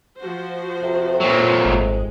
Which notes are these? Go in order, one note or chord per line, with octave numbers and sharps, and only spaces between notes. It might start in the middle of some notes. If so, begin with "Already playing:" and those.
F3 F#4 C5
F2 C3
A#2 F#3 F4 A#4 B4
G#1 G#3